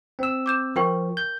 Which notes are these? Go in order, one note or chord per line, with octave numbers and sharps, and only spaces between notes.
C4 E6
D6 G6 E7
F3 A#4 G5 C#6
G6